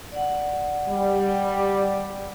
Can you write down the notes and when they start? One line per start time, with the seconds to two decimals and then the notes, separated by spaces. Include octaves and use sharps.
0.12 D5 F#5
0.88 G3